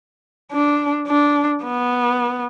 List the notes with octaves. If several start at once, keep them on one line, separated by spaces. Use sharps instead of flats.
D4
D4
B3